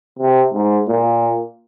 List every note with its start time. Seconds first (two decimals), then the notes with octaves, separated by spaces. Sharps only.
0.19 C3
0.53 G#2
0.88 A#2